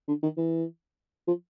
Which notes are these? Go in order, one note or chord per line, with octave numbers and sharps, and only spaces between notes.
D3
D#3
E3
F3